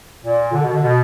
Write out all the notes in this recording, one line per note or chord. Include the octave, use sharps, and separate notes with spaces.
A#2
D3
B2
D3
B2